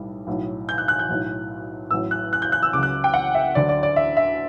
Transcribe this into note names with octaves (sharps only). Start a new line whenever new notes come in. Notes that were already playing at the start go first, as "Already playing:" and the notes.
Already playing: B1 A2 G3
B1 A2 F#3
G6
F#6
F#6
G6
B1 A2 F#3
A1 A2 F#3 E6
F#6
F#6
G6
F#6
E6
C#2 C#3 F#3 D6
F#6
G5
F#5
E5
D2 D3 F#3 D5
D5
D5
E5
E5